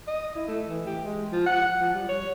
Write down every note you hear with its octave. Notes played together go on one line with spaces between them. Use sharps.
D#5
E4
A3
E3
G4
G#3
F3
F#5
F3
G3
C#5